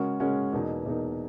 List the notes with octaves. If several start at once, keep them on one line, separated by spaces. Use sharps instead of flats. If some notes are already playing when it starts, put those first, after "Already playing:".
Already playing: C#3 G#3 C#4 F#4 A#4
C#3 G#3 C#4 F#4 A#4
E2 B2 A#3 D#4
E2 B2 A#3 D#4